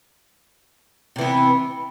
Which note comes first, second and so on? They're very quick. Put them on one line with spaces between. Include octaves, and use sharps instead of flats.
C3 E3 B3